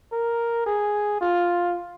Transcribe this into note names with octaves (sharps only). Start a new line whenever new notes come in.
A#4
G#4
F4